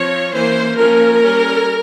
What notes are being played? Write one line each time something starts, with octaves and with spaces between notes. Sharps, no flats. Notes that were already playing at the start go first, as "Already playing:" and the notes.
Already playing: F3 C4 C#5
E3 A#3 C#4 C5
F3 A#3 C#4 A#4
G3 C#4